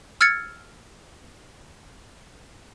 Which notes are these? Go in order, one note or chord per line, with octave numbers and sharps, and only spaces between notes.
E6 F6 G#6 A6 C#7